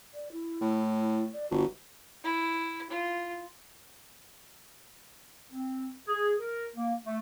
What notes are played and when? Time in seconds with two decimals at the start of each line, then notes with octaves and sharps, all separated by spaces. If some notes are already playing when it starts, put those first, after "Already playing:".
0.14 D5
0.32 E4
0.61 A2
1.33 D5
1.51 G1 F#4
2.24 E4
2.90 F4
5.52 C4
6.06 G#4
6.39 A#4
6.74 A#3
7.06 A3